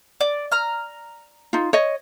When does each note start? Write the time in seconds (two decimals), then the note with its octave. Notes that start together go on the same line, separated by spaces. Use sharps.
0.21 D5
0.52 A#5 F6
1.53 D#4 F4
1.73 C#5 D#5